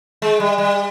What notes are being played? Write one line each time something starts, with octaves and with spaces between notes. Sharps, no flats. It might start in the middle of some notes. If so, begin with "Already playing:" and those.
G#3
G3
G3